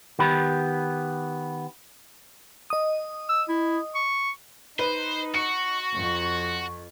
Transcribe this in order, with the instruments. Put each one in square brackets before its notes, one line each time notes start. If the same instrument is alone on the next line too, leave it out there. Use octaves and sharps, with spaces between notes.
[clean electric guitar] D#3 B3 G4 B5
[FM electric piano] D#5 D#6
[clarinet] E6
E4
C#6
[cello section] D#4 [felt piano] B4 D#7 [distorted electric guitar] C5
[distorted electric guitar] F#4 [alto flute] C#6 [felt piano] C#7
[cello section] F2